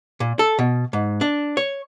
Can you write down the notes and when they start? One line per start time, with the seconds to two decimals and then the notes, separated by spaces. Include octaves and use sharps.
0.20 A#2
0.39 A4
0.59 B2
0.93 G#2
1.21 D4
1.57 C#5